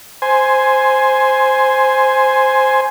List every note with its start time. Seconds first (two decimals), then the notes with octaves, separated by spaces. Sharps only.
0.22 C5 G#5